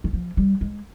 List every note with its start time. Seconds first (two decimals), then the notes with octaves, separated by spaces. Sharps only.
0.04 D#3
0.13 F3
0.37 G3
0.61 G#3